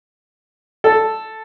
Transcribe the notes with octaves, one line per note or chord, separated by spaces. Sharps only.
A4